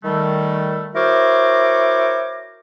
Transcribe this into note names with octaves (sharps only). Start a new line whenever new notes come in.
D#3 G3 A3
E4 F#4 A#4 C5 C#5 D6